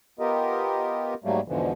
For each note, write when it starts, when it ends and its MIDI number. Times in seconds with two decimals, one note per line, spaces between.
0.19 1.14 59
0.19 1.14 65
0.19 1.14 67
0.19 1.14 70
0.19 1.14 75
1.24 1.40 44
1.24 1.40 54
1.24 1.40 55
1.24 1.40 57
1.24 1.40 58
1.48 1.73 40
1.48 1.73 44
1.48 1.73 47
1.48 1.73 50
1.48 1.73 52
1.48 1.73 53